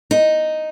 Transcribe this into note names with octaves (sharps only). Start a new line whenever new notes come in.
D#4